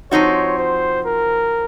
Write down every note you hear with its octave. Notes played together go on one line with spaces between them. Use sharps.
F3 C4 D#4 F#4 C#5
C5
A#4